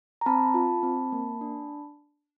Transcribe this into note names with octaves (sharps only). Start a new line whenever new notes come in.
A#5
C4 A5 B5
F4
C4
A#3
D4